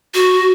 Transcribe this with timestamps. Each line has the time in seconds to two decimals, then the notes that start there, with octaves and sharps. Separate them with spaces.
0.14 F#4